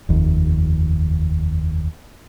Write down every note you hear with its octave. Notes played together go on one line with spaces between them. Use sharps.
F1 D#2